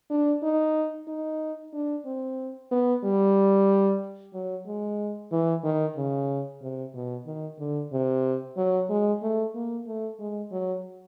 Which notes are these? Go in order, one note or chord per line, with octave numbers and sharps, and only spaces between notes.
D4
D#4
D#4
D4
C4
B3
G3
F#3
G#3
E3
D#3
C#3
C3
B2
D#3
D3
C3
F#3
G#3
A3
A#3
A3
G#3
F#3